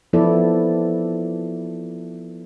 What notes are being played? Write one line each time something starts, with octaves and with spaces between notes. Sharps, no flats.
F3 B3 E4 A4 D5